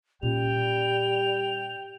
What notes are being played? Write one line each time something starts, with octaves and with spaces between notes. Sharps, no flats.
A#2 G3 C#4 G5 F7